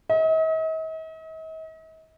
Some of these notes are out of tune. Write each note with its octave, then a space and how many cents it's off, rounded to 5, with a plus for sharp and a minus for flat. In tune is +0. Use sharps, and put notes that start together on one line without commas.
D#5 +45